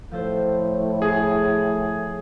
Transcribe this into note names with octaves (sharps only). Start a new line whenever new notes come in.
A2 F3 A4 C5
G#4